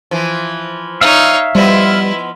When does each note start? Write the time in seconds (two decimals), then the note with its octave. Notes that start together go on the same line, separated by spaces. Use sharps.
0.11 E3 F3
1.01 D#4 C#5 E5 F5
1.55 F3 G3 B3 E4 D#5